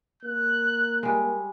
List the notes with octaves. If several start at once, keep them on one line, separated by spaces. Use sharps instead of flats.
A#3 F#6
G3 G#3